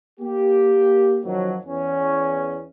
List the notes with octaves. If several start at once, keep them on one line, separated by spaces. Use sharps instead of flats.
A#3 G4
F#2 D#3 F3 F#3
E2 E3 C#4